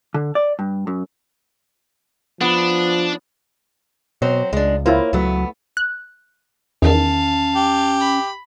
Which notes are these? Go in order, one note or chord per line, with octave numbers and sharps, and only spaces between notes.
D3
D5
G2
F#2
F3 B3 D4
B2 F#3 C4 C5
C#2 G#3 D4
A#3 E4 F4 C5 C#5
C#2 F#3 A3 B3
F#6
E2 D#3 C#4 F5 A5
G4
B5